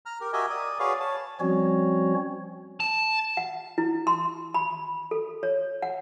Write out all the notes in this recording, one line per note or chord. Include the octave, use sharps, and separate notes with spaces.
A#5 F6
G4 A#4
F#4 G4 A#4 D#5 E5 G#5
D5 D#6
F#4 G#4 B4 C#5 D5 F5
C#5 A5
F3 G3 C4 C#4 F#4 C#5
A5
F#5
E4
C6
B5
A4
C#5
F#5